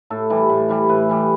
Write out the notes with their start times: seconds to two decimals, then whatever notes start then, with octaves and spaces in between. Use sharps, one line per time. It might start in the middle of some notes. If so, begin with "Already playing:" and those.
0.10 A2 A4
0.30 E3 G3
0.49 A2
0.69 E3 G3
0.89 A2 B4
1.09 E3 G3